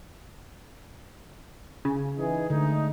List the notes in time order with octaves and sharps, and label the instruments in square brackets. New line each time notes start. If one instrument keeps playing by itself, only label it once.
[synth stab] C#3
[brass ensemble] E3 D#4 G#4
[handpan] D3 [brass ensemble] G#3 A3 D#4